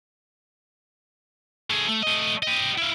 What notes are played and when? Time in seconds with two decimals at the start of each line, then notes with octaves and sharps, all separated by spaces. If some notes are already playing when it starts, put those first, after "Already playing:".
1.70 A3 G#4
1.88 A3
2.03 A3 D#5
2.43 G4 D#5
2.78 E4 F5